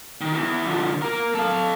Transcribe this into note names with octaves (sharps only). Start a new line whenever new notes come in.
D#3
E2 E3
D3 F3
A#3 A#4
A4 F5